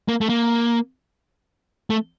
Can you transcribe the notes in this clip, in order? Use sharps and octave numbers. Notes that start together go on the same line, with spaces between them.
A#3
A3
A#3
A3